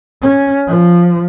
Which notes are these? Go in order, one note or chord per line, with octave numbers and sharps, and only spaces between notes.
C#4
F3